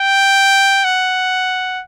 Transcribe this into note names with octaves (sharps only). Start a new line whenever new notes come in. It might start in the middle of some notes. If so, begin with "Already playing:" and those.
Already playing: G5
F#5